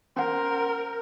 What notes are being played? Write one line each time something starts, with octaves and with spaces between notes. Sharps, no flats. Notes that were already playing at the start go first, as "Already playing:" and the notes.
C#4 A#4 C5 F#5